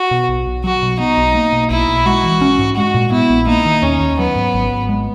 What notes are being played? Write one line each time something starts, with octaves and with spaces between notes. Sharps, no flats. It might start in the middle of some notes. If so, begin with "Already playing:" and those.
Already playing: F#4
B2
B1
B1
F#3 F#4
B2
B3 D#4
B1
A#3
B2
B1 E4
B1
G#3 F#4
E3
C#4
G#2
G#3 F#4
A#2
B3 E4
A#1
A#3 D#4
D#3
D#2 C#4
D#2
F#3 B3
G#2
G#1
G#1
G#3